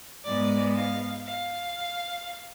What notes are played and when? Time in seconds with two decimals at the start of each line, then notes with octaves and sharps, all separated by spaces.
0.24 G#2 G#3 B3 D5
0.75 F5
1.26 F5